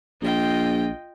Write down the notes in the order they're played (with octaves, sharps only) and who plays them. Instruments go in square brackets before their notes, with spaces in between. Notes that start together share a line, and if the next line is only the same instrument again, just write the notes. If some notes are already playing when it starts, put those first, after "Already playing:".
[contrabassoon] A#1 [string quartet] F4 D#5 G5